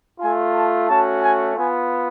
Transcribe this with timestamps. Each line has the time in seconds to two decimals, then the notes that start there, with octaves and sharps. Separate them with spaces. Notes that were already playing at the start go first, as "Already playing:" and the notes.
0.20 A3 F4 G#5
0.54 A5
0.88 A3 C#4 F#4 A5
1.22 G#5
1.55 B3 F4 G#5